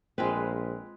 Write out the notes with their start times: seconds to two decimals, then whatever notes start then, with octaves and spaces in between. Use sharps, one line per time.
0.18 A#1 G#3 C4 F4 B4